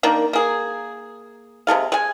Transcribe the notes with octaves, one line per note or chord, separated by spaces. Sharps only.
D#3 A#3 D4
A#3 G#4
C3 G#3 A4 F5
G#3 G#5